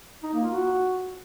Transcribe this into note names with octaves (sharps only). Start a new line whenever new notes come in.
D#4
A#3
F4
F#4